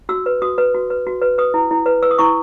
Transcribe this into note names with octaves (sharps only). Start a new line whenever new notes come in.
F#4 E6
B4
F#4 D#6
B4
F#4
B4
F#4
B4
B4 D#6
E4
E4
B4
B4 E6
D#6
E4 C#6